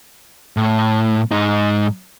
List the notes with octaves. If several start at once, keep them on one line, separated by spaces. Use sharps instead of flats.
A2
G#2 D#4